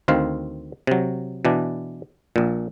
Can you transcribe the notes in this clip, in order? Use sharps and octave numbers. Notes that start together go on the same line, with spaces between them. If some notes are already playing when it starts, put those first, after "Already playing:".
D2 D#3 C4 F5
C3 F#3
B2 E3 D4
A#1 A#2